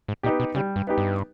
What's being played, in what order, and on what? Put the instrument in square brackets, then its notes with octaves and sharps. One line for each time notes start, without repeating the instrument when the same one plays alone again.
[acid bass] G#2
[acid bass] A#2 [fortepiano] B3 D#4 G4
[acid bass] B2
[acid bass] C#3 [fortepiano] G3
[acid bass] G2
[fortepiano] B3 D#4 G4
[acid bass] G2